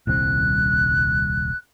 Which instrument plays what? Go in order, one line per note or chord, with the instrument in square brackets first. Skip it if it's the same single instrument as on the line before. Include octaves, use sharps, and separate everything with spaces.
[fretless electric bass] D#1 C2 C4 [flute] F#6